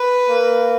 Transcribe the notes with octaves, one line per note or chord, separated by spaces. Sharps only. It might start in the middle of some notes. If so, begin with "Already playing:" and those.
Already playing: B4
A#3